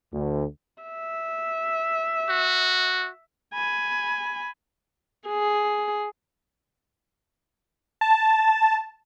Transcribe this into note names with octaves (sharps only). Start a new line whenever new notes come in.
D2
E5
F#4
G#5 B5
G#4
A5